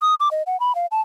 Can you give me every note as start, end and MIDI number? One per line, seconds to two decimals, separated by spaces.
0.02 0.14 87
0.20 0.29 86
0.31 0.43 75
0.47 0.59 78
0.60 0.75 83
0.75 0.86 77
0.91 1.01 81